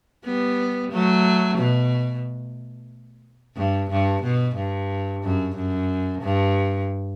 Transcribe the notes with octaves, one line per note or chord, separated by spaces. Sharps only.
G3 B3
F#3 A3
B2
G2
G2
B2
G2
F#2
F#2
G2